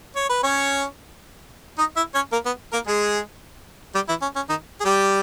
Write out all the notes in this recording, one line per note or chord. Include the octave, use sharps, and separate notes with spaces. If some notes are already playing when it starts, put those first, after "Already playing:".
C#5
B4
C#4 C#5
D#4 D#5
E4 E5
C#4 C#5
A#3 A#4
B3
A#3 A#4
G#3 G#4
G3 G4
E3 E4
C#4
C#4
D#3 D#4
G#4
G3 G4